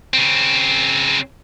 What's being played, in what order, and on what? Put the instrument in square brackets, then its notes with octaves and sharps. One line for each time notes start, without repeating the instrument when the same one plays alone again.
[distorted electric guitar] C#3 C4